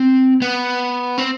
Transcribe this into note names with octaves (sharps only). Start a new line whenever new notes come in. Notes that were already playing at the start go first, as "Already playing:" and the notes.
Already playing: C4
B3
C4